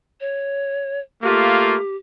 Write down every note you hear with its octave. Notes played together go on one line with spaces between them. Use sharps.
C#5
A3 A#3 F4 G4